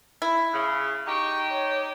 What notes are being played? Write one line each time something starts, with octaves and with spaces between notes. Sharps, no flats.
E4
C#3
D#4 G4 C#6
C#5